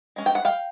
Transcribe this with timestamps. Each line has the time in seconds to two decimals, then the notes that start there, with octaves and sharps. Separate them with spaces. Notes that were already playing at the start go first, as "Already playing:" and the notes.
0.16 G#3 C#4
0.26 G5
0.35 F#5
0.45 F5 G5